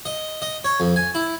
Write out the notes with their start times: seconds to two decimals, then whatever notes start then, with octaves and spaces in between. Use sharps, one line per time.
0.05 D#5
0.42 D#5
0.64 C#5
0.80 F2
0.96 G#5
1.15 E4